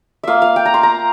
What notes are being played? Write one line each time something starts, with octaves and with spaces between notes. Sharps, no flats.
A#3 F4 E5 F5
F5
G5
A#5
C6
A#5